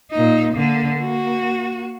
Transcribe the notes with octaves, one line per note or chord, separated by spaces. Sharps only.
A#2 D#4
D3 A#3
A#3 F#4